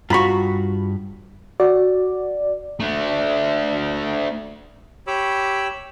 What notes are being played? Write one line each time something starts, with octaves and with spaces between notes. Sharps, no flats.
G2 F4 F#4 A#5 B5 C#6
F#4 D5
A3 D4
G4 C#5 B5 D6 E6